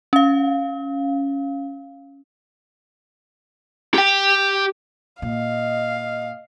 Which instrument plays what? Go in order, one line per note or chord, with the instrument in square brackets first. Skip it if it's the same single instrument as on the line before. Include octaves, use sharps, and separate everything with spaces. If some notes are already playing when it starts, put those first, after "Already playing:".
[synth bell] C#4 F5
[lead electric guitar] G4 G5
[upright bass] A#2 [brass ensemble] D#5 [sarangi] F5